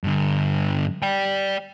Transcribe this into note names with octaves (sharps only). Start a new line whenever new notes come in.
G2 D3
D5 G5